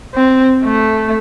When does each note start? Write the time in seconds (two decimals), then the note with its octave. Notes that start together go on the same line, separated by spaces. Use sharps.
0.14 C4
0.64 A3